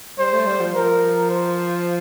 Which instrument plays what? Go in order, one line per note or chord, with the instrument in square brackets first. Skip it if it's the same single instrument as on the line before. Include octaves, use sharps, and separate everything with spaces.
[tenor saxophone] G3 [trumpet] C5
[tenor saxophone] A3
G3
F3
[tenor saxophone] F3 [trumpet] A#4
[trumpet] C5